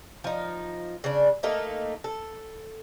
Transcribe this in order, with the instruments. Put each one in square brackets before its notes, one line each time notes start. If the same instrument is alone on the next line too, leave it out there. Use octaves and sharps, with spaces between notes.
[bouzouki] F3 D#4
C#3 D4
A3 A#3 D#4 A4
A4